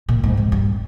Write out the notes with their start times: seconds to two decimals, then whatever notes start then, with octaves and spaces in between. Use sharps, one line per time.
0.09 A#2
0.24 G#2
0.37 F2
0.52 G2